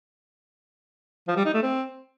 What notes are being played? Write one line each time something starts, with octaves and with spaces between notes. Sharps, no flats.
F3
G3
D#4
A3
C4